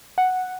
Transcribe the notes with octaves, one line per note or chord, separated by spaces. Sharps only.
F#5